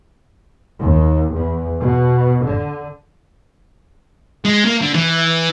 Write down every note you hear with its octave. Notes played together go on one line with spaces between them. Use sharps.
D#2
E2
B2
D3
G#3
A#3
D3
E3